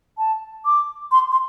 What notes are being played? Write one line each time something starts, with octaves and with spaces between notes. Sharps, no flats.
A5
D6
C6
C6